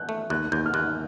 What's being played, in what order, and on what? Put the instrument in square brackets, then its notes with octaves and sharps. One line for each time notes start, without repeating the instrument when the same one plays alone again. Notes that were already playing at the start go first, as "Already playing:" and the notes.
Already playing: [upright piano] F#6 G6
[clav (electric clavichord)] A3
[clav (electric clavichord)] D#2 [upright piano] F#6
[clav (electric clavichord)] D#2 [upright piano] G6
[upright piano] F6
[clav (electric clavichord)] D#2 [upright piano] F#6